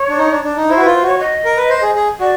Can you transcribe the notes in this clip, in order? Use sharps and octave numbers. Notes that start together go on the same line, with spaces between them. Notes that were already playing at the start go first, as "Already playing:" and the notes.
Already playing: C#5
D4
D#4
D4
D4
D#4
E4 C5
F#4
F4 B4
C5
F#4 C#5
D#5
A#4
B4
C5
G#4
G#4
F#4 D5